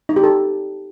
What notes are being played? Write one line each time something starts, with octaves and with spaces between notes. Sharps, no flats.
D#4
G4
A4